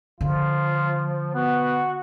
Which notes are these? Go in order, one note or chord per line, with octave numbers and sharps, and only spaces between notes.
D3 F3 F4
B3 F#4